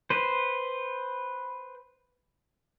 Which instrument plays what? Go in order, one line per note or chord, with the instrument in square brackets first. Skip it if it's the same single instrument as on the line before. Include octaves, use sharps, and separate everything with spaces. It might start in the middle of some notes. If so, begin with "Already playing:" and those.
[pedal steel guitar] B4 C5